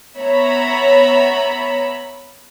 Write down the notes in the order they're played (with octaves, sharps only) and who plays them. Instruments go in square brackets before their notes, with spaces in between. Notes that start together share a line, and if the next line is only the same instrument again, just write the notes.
[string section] B3 C#5 E5 A#5 B5